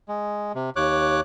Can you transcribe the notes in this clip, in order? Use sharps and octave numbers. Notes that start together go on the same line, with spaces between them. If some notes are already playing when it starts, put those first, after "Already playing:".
G#3
C3
D#2 C#5 D6 F#6